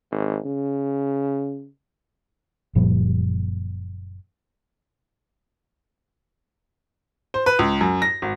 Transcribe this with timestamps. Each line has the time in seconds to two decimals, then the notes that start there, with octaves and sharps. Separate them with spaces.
0.11 G#1
0.45 C#3
2.75 F#1 A#2 F3 G3
7.34 C5
7.46 B4
7.59 C#2
7.81 F#2
8.02 A#6
8.22 G#1